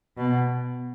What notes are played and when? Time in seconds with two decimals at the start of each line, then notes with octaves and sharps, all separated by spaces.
0.17 B2